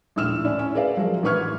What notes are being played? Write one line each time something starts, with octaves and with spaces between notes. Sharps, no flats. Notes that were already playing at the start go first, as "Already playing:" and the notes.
A#1 D#2 A2 E6 F6 E7
C#4 D4 E4 D5
C#4
G#4 A#4 B4 D5 E5 F5
F3 F#3 G#4 A#4
A1 D4 B4 C#6 F6 G#6